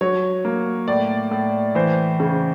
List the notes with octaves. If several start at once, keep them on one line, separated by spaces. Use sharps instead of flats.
F#3 C#5
A#3
A2 D5
A2
E3 C5
C#3